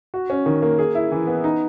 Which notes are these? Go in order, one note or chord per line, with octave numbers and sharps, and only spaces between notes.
F#4
C#4
D#3
A#3
G#4
E4
E3
B3
D#4